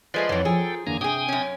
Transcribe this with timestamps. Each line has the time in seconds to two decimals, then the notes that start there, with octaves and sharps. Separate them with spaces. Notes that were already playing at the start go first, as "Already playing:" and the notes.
0.14 F3 G#3 A3 B4 D5 C6
0.29 F2 A2 E3 C#5 F#5
0.45 F3 G#4 A4 G5 A#5
0.87 E2 D3 A#3 D4 G#5 A#5
1.01 C3 C4 D4 G4 G#4 G5 G#5 D#6
1.29 F#2 C#4